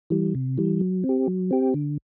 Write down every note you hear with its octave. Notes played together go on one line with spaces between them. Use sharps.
E3 G3
C3
E3 G3
F#3
C4
G4
F#3
C4 G4
D3